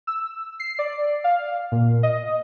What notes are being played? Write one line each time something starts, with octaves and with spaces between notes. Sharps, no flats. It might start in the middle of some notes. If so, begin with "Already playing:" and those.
E6
C7
D5
F5
A#2
D#5